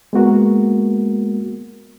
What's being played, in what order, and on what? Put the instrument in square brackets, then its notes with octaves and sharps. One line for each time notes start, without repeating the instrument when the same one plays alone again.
[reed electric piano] G#3 A#3 B3 F#4 A#4